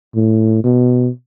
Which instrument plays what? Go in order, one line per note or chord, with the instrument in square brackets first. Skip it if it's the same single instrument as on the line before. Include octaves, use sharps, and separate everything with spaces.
[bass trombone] A2
B2